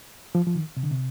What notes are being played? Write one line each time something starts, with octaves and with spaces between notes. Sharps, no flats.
F3
F3
D#3
C3
D3
C3